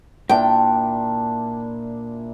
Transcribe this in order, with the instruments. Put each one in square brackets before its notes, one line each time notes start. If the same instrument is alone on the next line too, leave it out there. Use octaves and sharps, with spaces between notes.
[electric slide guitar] A#2 [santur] D4 E4 [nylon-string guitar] G5